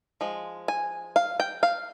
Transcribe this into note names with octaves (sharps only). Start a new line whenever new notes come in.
F3 G#3
G#5
F5
G5
F5